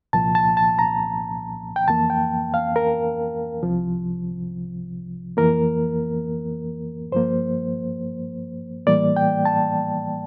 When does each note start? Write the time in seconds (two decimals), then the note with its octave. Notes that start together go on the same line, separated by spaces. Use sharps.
0.13 C2 A#2 F3 A#3 A5
0.35 A5
0.57 A5
0.79 A#5
1.76 G5
1.88 F2 E3 A#3 A5
2.10 G5
2.54 F5
2.76 A#4
3.63 C2 C3 F3
5.37 F2 E3 A#3 A#4
7.12 G2 F3 A#3 C5
8.87 A2 E3 G3 A#3 D5
9.16 G5
9.45 A5